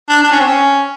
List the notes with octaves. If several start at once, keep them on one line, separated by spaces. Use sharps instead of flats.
D4
D4
C#4
C4
C#4